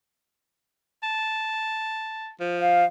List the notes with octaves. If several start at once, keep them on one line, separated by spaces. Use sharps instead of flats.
A5
F3
F5